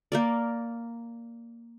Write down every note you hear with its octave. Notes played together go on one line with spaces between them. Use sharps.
A#3 A#4 D5